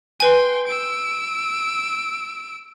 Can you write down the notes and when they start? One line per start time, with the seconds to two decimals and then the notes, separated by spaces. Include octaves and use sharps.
0.20 B4 G5 G#5 C6
0.67 E6 D7